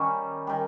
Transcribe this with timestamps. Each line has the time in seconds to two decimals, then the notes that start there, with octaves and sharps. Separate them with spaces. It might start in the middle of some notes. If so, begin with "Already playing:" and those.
Already playing: D#3 G3 C#4 C#6
0.47 D#3 G3